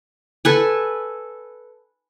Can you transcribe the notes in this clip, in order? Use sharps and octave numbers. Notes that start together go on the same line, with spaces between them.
A4 B4 G#5